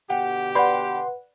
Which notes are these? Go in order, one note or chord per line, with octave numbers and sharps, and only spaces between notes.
B2 D3 G4 F#5
B4 D5 F#5 B5 C6 G6